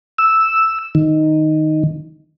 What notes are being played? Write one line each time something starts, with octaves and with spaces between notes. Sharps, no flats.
E6
D#3